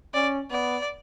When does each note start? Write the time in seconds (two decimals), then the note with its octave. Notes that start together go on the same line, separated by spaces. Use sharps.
0.14 C#4 D5
0.51 B3 D5